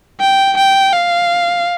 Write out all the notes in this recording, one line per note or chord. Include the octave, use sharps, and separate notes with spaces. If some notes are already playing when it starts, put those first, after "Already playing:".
G5
G5
F5